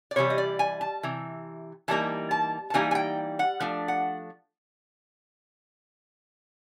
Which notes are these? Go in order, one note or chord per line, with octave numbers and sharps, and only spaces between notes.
D5
C3 E3 G3 C#5
D#5
D5
G#5
A5
C3 E3
E3 G3 A#3 D#4 A5
A5
A5
E3 G3 A#3 D#4 G#5
G#5
G5
F#5
F3 A3 D4
F#5